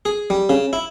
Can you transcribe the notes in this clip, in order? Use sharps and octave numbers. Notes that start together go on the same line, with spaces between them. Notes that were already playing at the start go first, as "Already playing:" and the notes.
G#4
G3
C#3
E4